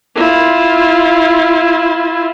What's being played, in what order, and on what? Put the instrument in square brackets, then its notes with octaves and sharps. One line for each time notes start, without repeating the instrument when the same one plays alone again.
[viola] E4 F4